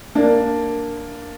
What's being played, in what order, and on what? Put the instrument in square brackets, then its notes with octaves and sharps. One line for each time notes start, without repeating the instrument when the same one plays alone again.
[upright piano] A#3 D4